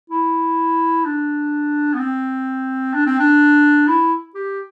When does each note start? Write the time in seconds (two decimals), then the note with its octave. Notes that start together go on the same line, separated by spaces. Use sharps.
0.10 E4
1.05 D4
1.94 B3
2.00 C4
2.94 D4
3.06 C4
3.20 D4
3.88 E4
4.35 G4